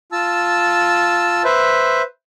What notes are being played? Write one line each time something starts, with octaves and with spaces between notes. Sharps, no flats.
F4 A5 E6
B4 C5 E5